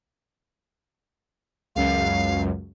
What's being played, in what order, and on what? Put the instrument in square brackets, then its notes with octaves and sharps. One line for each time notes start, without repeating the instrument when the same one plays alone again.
[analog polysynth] C#2 F#2 [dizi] F5